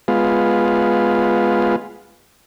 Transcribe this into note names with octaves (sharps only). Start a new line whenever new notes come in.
G#3 B3 F4